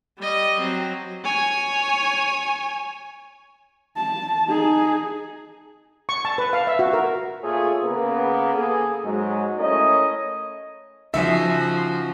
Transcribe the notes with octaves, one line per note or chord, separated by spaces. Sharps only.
G3 D#5
F#3 C4
C#5 G#5
A5
D#4 G#4
C#6
A5
B4
F5
E5
F#4
A#4
A#2 A3 F4 G#4 C#5
C#3 A#3 B3
A#3 G#4 A4
G#2 F#3 G#3
A3 C#4 E4 A#4 C#5 D#5
C#3 F3 D#4 F#4 E5 G#5